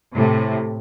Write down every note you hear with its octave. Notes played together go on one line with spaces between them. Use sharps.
A2 C3